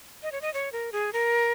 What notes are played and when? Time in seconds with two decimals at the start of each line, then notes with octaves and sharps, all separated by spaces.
0.23 D#5
0.32 C#5
0.42 D#5
0.54 C#5
0.72 A#4
0.92 G#4
1.13 A#4